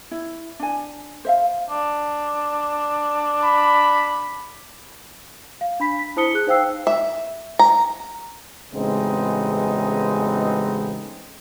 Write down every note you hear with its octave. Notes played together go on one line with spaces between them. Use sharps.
E4
D4 G#5
C5 E5 F5
D4
B5
F5
D4 B5 B6
B6
E4 C5 A5 D#6 C#7 G7
G#4 F#6
D#4 C5 F5 G5 E6 C7
E5
A#5
A1 C#3 G#3 B3 C4 D#4